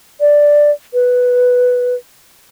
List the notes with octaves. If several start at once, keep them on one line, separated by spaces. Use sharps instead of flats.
D5
B4